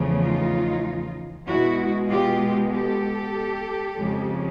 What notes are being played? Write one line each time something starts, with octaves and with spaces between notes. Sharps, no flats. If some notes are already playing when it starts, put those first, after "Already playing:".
Already playing: E2 C#3 F3 A3
D#4 F4
B2 G#3 E4 F#4
F4 G4
G4 A4
F2 C#3 F3 G#3